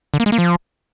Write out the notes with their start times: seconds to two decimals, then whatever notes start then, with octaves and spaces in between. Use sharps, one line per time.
0.14 D3
0.20 A#3
0.26 G#3
0.32 A#3
0.38 F3